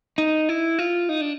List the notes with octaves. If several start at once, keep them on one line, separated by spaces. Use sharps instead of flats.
D#4
E4
F4
D#4
D4